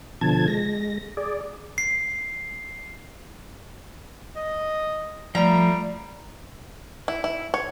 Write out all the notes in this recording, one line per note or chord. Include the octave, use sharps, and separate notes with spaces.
B2 D3 F3 A5 G#6
G#3 A#6
G#4 D5
C7
D#5
F3 G3 A3 A#5
E4
E4
C#5